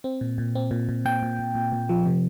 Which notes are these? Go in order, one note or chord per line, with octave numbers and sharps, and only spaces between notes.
C4
A#2
A#2
C4
A#2
A#2
A#2 G5
A#2
A#2
A#2
A#2
F3
C3